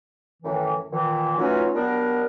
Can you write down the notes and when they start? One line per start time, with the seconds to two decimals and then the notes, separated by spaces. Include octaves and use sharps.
0.43 F#2 A2 D#3 E3
0.91 A#2 D#3 E3
1.38 E3 F#3 A3 C#4 D#4 F4
1.74 F#3 G3 B3 D4 A#4